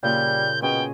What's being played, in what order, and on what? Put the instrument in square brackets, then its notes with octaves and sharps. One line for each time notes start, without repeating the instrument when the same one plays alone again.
[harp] A#2 C#3 [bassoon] G3 [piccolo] G6
[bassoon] B2 [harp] C#4 G#4 D#5 [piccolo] G5